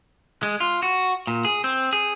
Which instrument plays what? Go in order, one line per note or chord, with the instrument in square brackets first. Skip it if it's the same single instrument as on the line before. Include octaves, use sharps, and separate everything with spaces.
[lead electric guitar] G#3
F4
F#4
A#2
G#4
C4
G#4